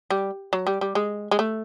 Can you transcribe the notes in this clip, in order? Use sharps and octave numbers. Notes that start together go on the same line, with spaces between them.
G3
F#3
G3
G3
G#3
G#3
A3